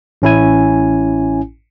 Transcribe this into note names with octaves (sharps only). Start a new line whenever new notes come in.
A1 C#4 E4 G#5